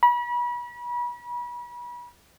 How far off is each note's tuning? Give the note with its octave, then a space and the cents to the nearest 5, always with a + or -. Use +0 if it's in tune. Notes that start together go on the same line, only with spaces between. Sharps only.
B5 -35